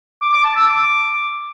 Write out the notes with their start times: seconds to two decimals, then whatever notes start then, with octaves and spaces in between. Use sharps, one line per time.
0.22 D6
0.33 D6
0.44 A5
0.56 E6
0.67 D6